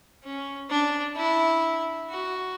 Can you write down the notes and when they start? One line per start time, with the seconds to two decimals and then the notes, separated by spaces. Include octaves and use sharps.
0.24 C#4
0.70 D4
1.17 E4
2.10 F#4